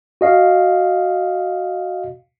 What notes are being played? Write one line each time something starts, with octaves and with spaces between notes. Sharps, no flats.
F#4 D#5 F5